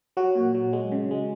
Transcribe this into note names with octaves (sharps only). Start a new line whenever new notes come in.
F#3 F#4
A#2
F#3
G#3
C#3
G#3